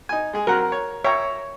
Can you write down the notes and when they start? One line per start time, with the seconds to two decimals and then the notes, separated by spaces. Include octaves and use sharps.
0.09 D#4 G#5
0.33 G#3 G#4
0.47 F#3 C4 A#4 F#5
0.72 C#5
1.04 C#5 E5 G5 A#5